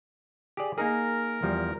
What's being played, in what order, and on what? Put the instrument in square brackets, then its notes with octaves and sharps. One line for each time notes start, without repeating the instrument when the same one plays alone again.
[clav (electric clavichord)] G4 G#4 D5
[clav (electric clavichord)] A#3 D#4 G#4 [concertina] A#4
[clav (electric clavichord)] E2 F3 G3